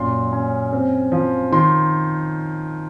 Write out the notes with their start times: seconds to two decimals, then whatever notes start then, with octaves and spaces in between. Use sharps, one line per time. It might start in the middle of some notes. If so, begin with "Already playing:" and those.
Already playing: F#2 A#2 C6
0.32 C#4
0.73 C4
1.12 F3
1.52 D#3 C6